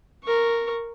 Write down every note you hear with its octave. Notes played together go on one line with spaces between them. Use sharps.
A#4 C#6